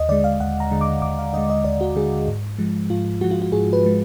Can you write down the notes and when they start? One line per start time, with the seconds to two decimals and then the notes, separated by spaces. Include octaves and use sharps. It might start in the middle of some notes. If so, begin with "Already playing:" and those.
Already playing: D#2 D#5
0.09 D3 D5
0.12 G#3
0.24 F5
0.40 D#2 F#5
0.60 A#5
0.71 D3 G#3
0.81 D6
1.02 D#2 D6
1.19 F5
1.33 D3 D#5
1.37 G#3
1.50 D#5
1.64 D#2 D5
1.81 F#4
1.95 D3 G#3 G#4
2.28 G#2
2.59 F3 G#3
2.90 G#2 F4
3.21 F3 G#3 F#4
3.31 F4
3.42 F#4
3.52 G#2 G#4
3.73 B4
3.83 F3 G#3